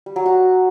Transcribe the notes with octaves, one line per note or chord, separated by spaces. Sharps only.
G3
F#3
F#4